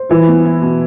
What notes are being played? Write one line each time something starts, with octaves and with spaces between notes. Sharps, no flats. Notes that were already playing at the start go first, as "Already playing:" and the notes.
Already playing: C5
E3 E4
B3
E4
B2